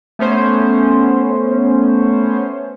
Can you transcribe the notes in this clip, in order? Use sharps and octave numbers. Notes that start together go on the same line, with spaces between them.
A3 B3 C#4 C5